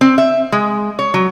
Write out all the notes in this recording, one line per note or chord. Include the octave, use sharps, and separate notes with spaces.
C4
E5
G#3
C#5
F#3